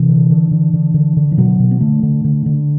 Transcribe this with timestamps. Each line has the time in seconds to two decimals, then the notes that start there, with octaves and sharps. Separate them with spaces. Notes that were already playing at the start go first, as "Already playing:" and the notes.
Already playing: C3 E3
0.08 D3
0.30 D3
0.51 D3
0.73 D3
0.94 D3
1.17 D3
1.31 E3
1.37 B2 F#3
1.60 B2
1.71 B3
1.80 D3 A3
2.03 D3
2.24 D3
2.46 D3